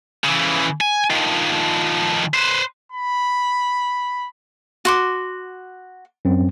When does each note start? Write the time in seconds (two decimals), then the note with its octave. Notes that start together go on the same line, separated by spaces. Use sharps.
0.24 C#3 E3
0.81 G#5
1.10 D#3 F3
2.34 B4 C5
2.92 B5
4.85 F#4 C6 D6
6.25 F#2 C4